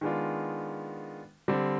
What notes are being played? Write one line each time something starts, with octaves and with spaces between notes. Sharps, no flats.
D#3 G#3 B3 D4 F4
D3 G3 C4